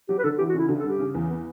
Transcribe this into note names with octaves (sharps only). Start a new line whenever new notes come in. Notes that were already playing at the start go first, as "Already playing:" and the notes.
F#3 G4
B4
D3 A4
E3 G4
F#4
C#3 E4
D3 F#4
A4
G2
G4
C#3
E2
B3